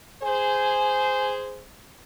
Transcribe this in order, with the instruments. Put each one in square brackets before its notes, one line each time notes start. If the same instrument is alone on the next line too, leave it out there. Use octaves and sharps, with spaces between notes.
[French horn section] G#4 C5 [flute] G#5